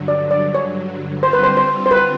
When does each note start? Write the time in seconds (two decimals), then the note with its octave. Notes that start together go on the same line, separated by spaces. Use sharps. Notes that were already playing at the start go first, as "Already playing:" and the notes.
Already playing: G2 D3 F#3
0.08 D5
0.31 D5
0.55 C#5
1.23 D3 G3 C4 F4 C5
1.33 B4
1.43 C5
1.57 C5
1.86 C5
1.91 B4